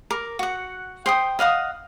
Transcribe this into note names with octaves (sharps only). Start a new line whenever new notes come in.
A#4 D6
F#4 F#5
C5 G5 D#6
D#5 F5 F#5 D#6